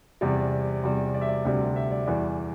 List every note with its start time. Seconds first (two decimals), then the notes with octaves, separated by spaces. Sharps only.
0.21 E2 C3 G3 D5
0.83 E2 C3 G3
1.14 D5
1.22 E5
1.29 D5
1.45 D2 C3 G3
1.76 E5
1.92 D5
2.06 E2 E3 G3 D5